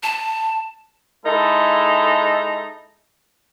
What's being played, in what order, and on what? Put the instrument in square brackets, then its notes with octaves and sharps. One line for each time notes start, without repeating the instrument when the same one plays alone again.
[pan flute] A5
[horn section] G#3 D#4 E4 A4